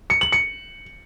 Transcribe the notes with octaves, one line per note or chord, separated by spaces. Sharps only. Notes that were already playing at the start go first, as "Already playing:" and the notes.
C#7
F#7
C#7